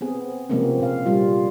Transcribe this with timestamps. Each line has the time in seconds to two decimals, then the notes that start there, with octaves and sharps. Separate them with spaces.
0.01 B3 C4 G#4
0.49 C3 F3 G#3 A#3 C4 C#4
0.80 A#2 F5
1.06 F3 G3 F4